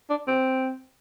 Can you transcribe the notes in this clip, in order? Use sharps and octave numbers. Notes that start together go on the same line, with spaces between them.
D4
C4